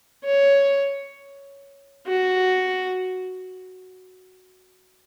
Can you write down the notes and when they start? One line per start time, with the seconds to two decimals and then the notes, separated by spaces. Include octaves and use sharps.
0.25 C#5
2.07 F#4